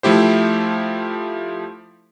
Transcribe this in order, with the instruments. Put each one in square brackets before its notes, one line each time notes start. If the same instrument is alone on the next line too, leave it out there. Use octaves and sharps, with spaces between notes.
[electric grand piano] F3 A3 E4 G4 C5